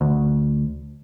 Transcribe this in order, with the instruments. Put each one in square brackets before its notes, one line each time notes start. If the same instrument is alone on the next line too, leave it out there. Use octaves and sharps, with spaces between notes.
[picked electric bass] D2